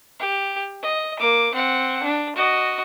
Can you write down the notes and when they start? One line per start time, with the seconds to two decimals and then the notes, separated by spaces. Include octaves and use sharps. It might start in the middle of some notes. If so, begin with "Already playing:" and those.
0.20 G4
0.82 D#5
1.19 A#3 D6
1.54 C4 F#5
2.03 D4
2.36 F#4 D#5